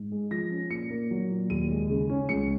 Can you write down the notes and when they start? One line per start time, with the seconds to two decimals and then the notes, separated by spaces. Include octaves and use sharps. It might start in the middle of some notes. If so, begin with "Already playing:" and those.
Already playing: G#2
0.12 G#3
0.31 F3 A#6
0.51 C#4
0.70 A#2 C#7
0.91 A#3
1.11 F#3
1.30 A#2
1.50 D#2 D#7
1.70 G#3
1.90 C#3
2.09 C#4
2.29 C#2 C#7